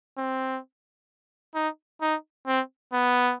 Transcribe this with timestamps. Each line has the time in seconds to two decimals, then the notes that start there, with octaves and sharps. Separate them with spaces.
0.18 C4
1.55 D#4
2.01 D#4
2.47 C4
2.93 B3